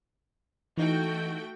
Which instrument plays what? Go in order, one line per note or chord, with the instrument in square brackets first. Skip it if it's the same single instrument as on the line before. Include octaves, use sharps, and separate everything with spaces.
[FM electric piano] E3 D#4 [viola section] A3 F#4 G5